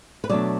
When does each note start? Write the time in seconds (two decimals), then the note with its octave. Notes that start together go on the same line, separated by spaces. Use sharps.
0.24 B4
0.30 B2 F#3 A3 D4 D5